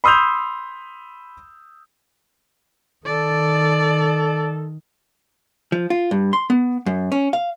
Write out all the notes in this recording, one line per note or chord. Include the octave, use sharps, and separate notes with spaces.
B5 C6 D#6 E6 G6 F7
D#3 A4 D5
F3
F4
G2
C6
B3
F#2
C#4
F5